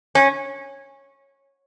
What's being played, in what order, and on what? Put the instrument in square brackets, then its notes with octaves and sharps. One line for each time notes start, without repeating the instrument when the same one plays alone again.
[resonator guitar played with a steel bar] C#4